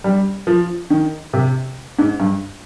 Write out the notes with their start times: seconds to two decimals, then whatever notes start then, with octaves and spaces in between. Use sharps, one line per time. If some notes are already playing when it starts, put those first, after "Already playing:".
0.04 G3
0.47 F3
0.90 D#3
1.33 C3
1.99 G#2
2.20 G2